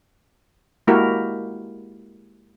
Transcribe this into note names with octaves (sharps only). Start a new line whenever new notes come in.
G#3 A#3 E4 F#4 G4 A#4